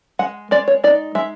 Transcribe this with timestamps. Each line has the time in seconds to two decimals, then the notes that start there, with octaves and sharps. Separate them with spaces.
0.19 G#3 F#5
0.51 G#3 D5
0.68 C#5
0.84 D#4 D5
1.15 G#3 E5